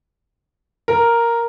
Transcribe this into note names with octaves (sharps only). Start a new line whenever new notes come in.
A#4